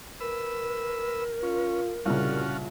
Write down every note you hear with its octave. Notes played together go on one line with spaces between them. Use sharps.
A#4 B4 E6
C#4 F4
C2 A#2 C#3 G3 C#4 F4 F#4